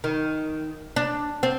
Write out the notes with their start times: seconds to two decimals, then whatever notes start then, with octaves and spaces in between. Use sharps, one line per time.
0.04 D#3
0.96 D4
1.43 C4